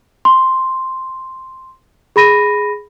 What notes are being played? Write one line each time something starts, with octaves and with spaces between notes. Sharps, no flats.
C6
G#4 B5 A#6 D#7